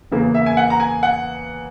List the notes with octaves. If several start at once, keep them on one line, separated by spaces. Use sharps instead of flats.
E2 C#3 E3 A#3
E5
G#5
F#5
A#5
G#5
F#5